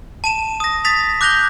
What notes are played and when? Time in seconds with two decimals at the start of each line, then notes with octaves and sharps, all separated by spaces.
0.24 A5 D#7 E7
0.60 D#6 A#6
0.85 D#6 A6 B6 F7
1.21 D6 F#6 G6 A#6 F7 G7